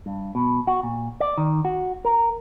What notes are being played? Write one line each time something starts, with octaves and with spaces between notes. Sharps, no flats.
G2
B2
F#4
A#2
D5
D#3
F#4
A#4